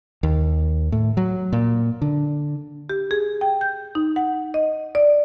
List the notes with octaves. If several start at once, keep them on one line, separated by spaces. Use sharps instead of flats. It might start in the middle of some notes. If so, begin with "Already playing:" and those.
D#2
A2
F#3
A#2
D3
G4
G#4
G5
G6
D#4
F#5
D#5
D5